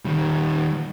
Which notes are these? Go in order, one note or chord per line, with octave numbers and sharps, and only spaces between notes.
D#3 G3